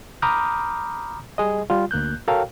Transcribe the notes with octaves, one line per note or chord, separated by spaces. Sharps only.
A#5 B5 D6 D#6 F6 G6
G3 G#4 D#5
G3 F4
D2 A#3 F#6 G6
F#4 A4 A#4 C#5 F5 G5